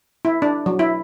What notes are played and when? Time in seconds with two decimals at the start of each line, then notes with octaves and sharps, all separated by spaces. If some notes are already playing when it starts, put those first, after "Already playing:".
0.25 E4
0.42 D4
0.66 F#3
0.79 E4